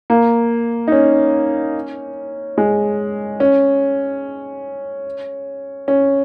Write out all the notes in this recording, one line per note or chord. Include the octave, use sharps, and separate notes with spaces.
A#3
D#4
C#4
G#3
C#4
C#4